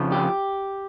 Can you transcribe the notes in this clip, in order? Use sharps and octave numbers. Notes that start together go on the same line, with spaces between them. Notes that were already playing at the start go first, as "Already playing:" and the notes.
Already playing: F2 C#3 F3
G4